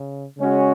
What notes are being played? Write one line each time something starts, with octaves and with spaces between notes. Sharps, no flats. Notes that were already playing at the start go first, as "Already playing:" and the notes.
Already playing: C#3
C#3 G#3 C#4 F#4